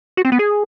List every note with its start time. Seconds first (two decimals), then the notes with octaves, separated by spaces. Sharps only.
0.17 F#4
0.25 C4
0.32 B3
0.39 G#4